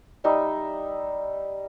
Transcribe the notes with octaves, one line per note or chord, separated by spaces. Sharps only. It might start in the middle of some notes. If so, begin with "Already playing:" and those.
G3 D#4 D#5 E5